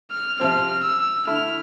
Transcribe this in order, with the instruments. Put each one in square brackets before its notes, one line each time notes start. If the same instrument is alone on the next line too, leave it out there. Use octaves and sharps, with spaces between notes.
[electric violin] F6
[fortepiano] C3 F3 C4 [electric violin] F6
[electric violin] E6
[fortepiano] D3 A3 E4 [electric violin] F6